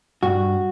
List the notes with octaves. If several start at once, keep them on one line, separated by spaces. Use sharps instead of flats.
G2 F#4